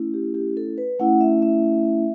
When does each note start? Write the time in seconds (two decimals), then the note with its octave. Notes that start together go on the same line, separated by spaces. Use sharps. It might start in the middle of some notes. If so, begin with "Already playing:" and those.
Already playing: A3 C#4 E4
0.14 G4
0.34 G4
0.57 A4
0.78 B4
0.99 A3 C#4 E4 F#5
1.21 E5
1.42 E5